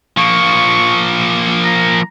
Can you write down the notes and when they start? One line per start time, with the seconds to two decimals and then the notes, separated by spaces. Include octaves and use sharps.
0.18 F3 A#3 C#6
1.64 A#5